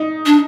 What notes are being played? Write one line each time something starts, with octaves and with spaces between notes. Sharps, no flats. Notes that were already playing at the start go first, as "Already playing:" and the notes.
Already playing: D#4
D4